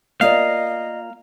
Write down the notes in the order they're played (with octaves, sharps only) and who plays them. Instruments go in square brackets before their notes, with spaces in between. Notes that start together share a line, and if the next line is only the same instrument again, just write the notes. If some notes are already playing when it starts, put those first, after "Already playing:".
[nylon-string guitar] A#3 F4 D5 [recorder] D#5 [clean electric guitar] F5